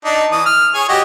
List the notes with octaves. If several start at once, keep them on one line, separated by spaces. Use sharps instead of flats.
D4 D#4
E3 D#6
F6
G#4 C#5 G#5
F#4 G4 D#5